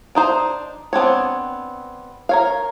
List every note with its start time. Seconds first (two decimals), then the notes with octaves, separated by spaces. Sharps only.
0.15 D4 D#4 C5
0.93 B3 C4 D4 C#5
2.29 A#4 C#5 F5